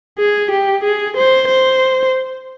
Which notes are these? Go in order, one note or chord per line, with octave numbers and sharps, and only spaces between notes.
G#4
G4
G#4
C5
C5